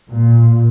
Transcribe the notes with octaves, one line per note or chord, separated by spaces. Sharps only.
A#2